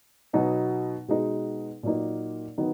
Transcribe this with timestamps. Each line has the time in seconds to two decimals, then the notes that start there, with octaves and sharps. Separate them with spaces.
0.33 B2 F#3 B3 D#4
1.08 B2 G#3 D#4
1.83 A#2 F#3 A#3 D#4
2.58 D#3 F#3 B3 D#4